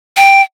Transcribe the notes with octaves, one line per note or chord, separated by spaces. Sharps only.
G5